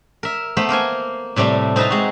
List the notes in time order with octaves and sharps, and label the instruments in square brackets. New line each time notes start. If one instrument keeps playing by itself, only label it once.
[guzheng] A#4 E5
A3 B3 C5 B5
A#3 A#4 C5 G#5
A2 C3 G3 A3 C4
C4 D#4 G#4 B4 A5 A#5
G#3 F#4